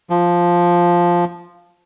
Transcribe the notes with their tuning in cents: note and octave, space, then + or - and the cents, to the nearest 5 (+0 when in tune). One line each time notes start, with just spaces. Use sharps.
F3 +0